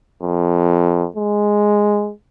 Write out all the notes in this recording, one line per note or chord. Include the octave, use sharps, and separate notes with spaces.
F2
G#3